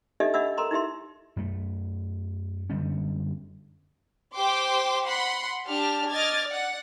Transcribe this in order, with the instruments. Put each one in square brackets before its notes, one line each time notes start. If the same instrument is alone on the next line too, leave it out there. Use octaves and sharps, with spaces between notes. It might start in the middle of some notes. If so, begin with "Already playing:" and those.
[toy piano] D4 D#4 G4 A4 D#5 E5
D4 D#5 E5 F#5 B5 E6
A4 A#4 A#5 C6 D6
D#4 E4 G4 E5 C6
[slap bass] F#2 A3
F#2 D3 G3 C#4
[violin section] G4 C5 G5 C6 D6
F#5 B5 C6
D4 G4 A5 F6
D#5 D6 F6 G#6 A6
D5 F#5